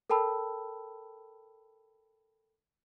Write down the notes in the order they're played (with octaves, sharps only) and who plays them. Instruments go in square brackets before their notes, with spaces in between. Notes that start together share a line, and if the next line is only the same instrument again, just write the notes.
[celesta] A4 A#4 G5 A5 B5 E6